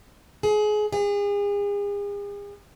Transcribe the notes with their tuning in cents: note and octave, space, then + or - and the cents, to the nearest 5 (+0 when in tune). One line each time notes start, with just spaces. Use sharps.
G#4 +25
G#4 -40